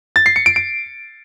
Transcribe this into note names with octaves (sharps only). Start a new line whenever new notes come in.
A6
C7
C#7
D7
D7